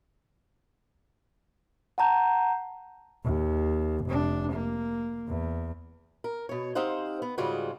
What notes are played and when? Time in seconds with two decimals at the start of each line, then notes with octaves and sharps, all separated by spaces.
1.98 F#5 A5 A#5 G6
3.24 D#2
4.05 F1 D4
4.52 A#3
5.28 E2
6.24 A#4
6.49 B2 C#5
6.75 C4 D#4 G4 C5 F5 F#5
7.22 B3
7.38 G#2 C#3 G3 F4 F#4